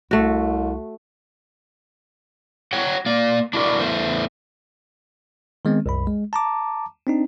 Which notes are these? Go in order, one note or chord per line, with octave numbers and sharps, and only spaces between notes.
C2 A3 F#4
C#5 F#5 G5
A#3 D5
D4 E4 F#4 A#4 D5
E2 E3 A3 C5
D#3 G#3 B3 C4
C2 F#2 B5
G#3
A5 A#5 D6
C4 D4 D#4